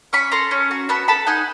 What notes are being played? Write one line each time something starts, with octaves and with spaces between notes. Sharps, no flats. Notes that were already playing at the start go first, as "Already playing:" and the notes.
C#4 B5 C#6
A4 A#5 C6
C#4
F#4
B3 A5 B5
A4 A5 B5
D#4 F#5 G#5